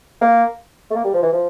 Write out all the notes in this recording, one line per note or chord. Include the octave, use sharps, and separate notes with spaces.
A#3
A3
A#3
G3
F3
E3
F3